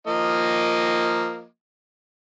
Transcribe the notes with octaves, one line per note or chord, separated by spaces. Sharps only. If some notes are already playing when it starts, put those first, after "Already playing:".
F3 A#3 D#5